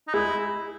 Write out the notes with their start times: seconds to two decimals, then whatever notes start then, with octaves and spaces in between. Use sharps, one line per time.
0.08 D#4
0.14 G#3 E4 G#4